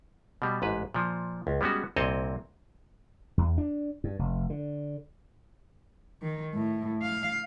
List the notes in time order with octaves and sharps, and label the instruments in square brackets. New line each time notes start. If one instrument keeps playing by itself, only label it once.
[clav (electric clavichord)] B2 G3
A1 G#2 B4
A#2 F3
C#2
G3 G#3 B3 C#4 F#4
C2 A#2 C4 C#5 D#5 A5
[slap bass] E2
D4
G2
F1
D3
[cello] D#3
A2
F5